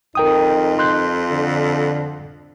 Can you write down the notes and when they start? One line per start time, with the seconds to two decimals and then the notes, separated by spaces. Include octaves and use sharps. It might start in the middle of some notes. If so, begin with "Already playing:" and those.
0.15 F2 D#4 A#4 G5 D#6
0.79 C6 F#6 G6
1.32 D3